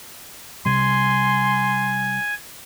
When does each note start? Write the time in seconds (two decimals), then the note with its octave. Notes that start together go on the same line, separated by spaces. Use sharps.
0.66 C3 G3 G#5 C6